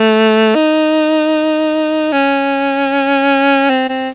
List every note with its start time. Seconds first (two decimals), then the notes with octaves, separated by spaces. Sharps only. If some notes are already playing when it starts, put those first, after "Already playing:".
Already playing: A3
0.55 D#4
2.12 C#4
3.70 C4
3.89 C4